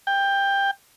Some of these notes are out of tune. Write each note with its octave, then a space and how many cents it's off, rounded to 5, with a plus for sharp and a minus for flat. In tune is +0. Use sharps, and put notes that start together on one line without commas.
G5 +15